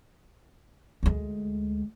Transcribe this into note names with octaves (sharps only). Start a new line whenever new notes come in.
D2 G#3